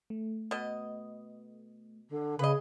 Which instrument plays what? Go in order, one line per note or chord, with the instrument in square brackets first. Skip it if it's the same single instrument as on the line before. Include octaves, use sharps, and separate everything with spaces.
[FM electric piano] A3
[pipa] B2 D#5
[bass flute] D3
[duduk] C#3 [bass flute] G#4 [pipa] B4 D#5